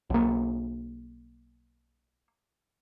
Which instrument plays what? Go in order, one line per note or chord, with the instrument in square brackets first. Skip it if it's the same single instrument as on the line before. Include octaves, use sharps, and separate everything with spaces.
[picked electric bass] B1 A#3